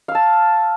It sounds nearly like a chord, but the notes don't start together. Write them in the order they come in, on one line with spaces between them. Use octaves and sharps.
F5 E6 A5